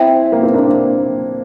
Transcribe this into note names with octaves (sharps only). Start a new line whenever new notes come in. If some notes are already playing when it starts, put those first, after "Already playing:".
Already playing: C4 E4 E5 G5
A#3
C4
A#3 D4